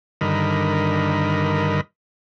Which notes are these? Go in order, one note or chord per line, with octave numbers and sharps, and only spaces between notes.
G2 D3 D#3 A#4 D#5 B5